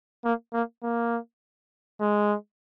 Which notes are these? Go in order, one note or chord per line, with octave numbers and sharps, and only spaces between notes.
A#3
A#3
A#3
G#3